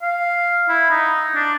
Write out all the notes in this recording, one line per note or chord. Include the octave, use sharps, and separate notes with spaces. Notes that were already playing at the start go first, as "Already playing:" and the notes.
F5
E4
D#4
D4